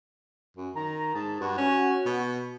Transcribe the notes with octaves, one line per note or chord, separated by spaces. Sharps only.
F#2
D#3 A#5
G#2 A5
G2 F#4
C#4
B2